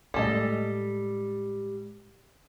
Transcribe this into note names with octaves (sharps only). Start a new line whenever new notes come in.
A2 G3 G#3 A4 D#5